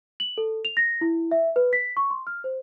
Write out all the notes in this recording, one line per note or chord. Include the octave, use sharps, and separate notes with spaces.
F#7
A4
F7
A#6
E4
E5
B4
B6
C#6
C6
F6
C5